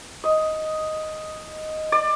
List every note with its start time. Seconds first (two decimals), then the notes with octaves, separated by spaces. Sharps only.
0.24 D#5
1.92 D5